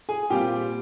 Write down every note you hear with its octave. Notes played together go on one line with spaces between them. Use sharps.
G#4 G#5
A#2 G3 C4 F4 G4 G5